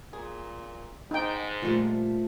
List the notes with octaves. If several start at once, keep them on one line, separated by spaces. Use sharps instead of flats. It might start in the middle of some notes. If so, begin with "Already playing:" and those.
A#2 G#4
G#2 D#4 G5
A#2 F3 G3 A3 F4